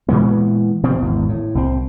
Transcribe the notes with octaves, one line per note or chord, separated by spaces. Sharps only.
A#2 E3 G#3 B3
B2 F3 C4
G#1 E2
A2
C2 C4